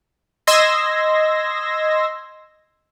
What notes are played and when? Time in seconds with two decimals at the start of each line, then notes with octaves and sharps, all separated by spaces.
0.47 D#5 C6 E6 G#6 A#6